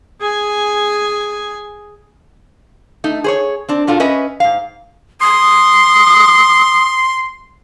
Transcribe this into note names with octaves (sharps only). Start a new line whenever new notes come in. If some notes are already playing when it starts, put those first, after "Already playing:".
G#4 G#5
A3 D#4
G#4 C5 C#5
C4 D4
A#2 D4 F4 F#4 A4
C#4 B4 D#5 E5
G#2 F5
C6 D#6